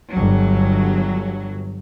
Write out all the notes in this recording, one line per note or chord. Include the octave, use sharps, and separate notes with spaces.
G1 F#3